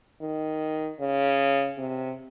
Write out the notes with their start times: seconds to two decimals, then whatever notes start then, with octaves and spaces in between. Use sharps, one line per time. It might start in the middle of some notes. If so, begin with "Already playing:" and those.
0.22 D#3
1.00 C#3
1.78 C3